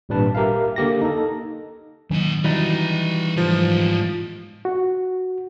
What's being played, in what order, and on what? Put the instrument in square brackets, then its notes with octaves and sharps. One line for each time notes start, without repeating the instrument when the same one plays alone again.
[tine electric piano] G#1 A#2 G3 D4 B4 A5
G4 A#4 E5 F5
D3 A#3 G4 A#6
D#4 A4
[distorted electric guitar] A#2 D#5 [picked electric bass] D#3 F#3 C#4
[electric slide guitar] E3 G3 D#4 [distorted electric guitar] F#4 F5
[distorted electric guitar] G#2 D3 [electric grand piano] F3
[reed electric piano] F#4